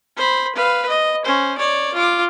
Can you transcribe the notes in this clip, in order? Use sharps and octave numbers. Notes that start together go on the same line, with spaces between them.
C5 B5
B4 F5
D#5
C#4 C5
C#5 D5
F4 D6